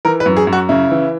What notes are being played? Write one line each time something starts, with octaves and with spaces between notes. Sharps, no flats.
E3 A#4
B4
F#2
G#4
F#2
F#4
C#3 E4
E3